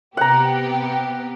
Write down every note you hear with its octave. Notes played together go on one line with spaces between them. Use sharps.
C3 B3 G4 F#5 A#5